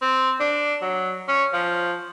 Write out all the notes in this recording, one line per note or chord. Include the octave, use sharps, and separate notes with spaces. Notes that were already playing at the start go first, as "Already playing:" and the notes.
C4
D4
F#3
C#4
F3